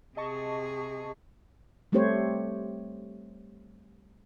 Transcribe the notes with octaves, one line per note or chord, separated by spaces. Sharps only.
C3 G#4 D#5 A5 C#6
G3 A3 C4 G4 C5 C#5